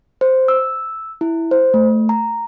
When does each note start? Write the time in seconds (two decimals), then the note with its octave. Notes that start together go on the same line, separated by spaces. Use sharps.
0.21 C5
0.48 E6
1.21 E4
1.51 C5
1.74 A3
2.09 A#5